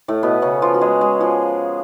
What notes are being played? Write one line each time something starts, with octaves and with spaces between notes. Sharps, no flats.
A2 A3
B2 B3
C#3 C#4
F3 F4
F#4
G#3 G#4
G#3 G#4
F3 F4